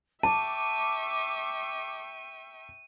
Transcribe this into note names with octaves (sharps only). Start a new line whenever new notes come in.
E5 G5 A5 C#6 D6 D#7